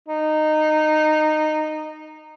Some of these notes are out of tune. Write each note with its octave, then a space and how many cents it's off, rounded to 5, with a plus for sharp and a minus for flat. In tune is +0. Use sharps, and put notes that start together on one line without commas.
D#4 -15